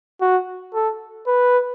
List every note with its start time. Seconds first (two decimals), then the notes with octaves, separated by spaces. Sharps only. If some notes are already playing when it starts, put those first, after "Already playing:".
0.21 F#4
0.74 A4
1.27 B4